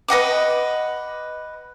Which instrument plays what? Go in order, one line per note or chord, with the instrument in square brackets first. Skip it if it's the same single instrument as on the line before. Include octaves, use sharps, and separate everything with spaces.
[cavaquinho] B4 D#5 F#5 D6